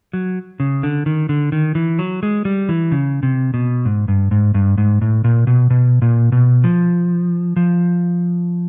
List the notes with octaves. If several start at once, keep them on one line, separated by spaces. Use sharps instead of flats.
F#3
C#3
D3
D#3
D3
D#3
E3
F#3
G#3
G3
E3
C#3
C3
B2
G#2
G2
G#2
G2
G#2
A2
A#2
B2
B2
A#2
B2
F3
F3